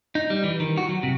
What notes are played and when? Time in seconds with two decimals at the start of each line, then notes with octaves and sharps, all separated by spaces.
0.15 D#4
0.30 G3
0.44 E3
0.60 D#3
0.78 F#4
0.89 F#3
1.03 C3